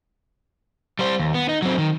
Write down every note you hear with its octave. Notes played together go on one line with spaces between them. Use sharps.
G3 C5
D#2
B3
D#4
F#3 C4
D#3